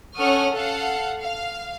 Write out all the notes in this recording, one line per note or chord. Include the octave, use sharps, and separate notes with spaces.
C#4 A4 F#5 C#6 D#6 F6
A4 F5 F#5
F5